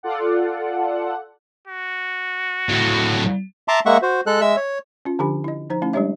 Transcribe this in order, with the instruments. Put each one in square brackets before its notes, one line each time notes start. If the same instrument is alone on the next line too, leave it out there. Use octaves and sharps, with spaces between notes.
[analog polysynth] F4 A4 D5 F#5
[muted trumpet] F#4
[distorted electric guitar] A2 F#3
[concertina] E5 A5 A#5 C6 D6
G#3 A#3 E5 F#5 C#6
F#4 C5
G#3 A4 F#6
G#3 E5 E6
C#5
[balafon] C#4 F4
D3 F3 D4 G4 G#5 B5
E4 D#5
F3 D#4 C5 A#5
A3 C#4 E4
G3 G#3 D4 G4 C#5 E5